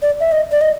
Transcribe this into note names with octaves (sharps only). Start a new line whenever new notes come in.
D5
E5
D#5
D5
D#5